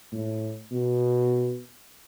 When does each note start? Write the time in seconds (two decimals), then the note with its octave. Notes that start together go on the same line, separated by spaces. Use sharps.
0.12 A2
0.72 B2